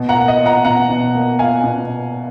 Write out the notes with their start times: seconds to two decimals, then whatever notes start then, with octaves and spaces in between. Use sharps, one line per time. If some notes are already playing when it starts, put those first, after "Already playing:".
Already playing: B2
0.09 F#5 A#5
0.15 A#3
0.28 D#5
0.40 F4
0.46 F#5 A#5
0.65 B2 F#5 A#5
0.89 B2
1.15 A#3
1.39 F4 F5 G#5
1.64 B2